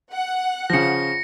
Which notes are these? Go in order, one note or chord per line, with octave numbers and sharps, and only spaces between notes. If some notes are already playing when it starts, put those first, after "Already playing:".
F#5
C#3 F3 A#6 C#7